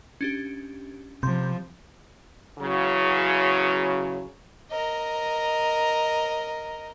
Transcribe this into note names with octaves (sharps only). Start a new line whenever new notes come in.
C#4 D4 G4
C3 F3 B5 C6 G6
E2 C#3 F#3
A#4 D#5